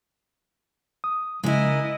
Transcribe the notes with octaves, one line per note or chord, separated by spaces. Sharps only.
D#6
C#3 G#3 E4 A#4 D#5